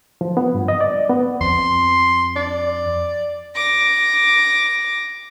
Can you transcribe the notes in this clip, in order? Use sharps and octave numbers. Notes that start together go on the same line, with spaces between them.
F3
B3
G2
D#5
D5
B3
F2 C6
D5
D6 A#6